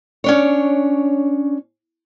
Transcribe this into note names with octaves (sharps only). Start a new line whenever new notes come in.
C#4 D4 C#5